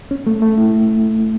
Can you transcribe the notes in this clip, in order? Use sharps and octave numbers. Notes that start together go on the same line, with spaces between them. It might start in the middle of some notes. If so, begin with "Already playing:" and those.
C#4
A3
A3
E4